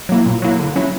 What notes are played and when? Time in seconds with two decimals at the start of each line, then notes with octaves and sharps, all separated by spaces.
0.09 F#3 A#3 E4
0.26 A#2
0.42 F#3 A#3 E4
0.59 D3
0.76 F#3 C#4 E4